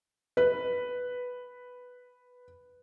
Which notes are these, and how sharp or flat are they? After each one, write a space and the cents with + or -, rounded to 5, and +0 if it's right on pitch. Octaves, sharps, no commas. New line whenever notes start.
B4 +0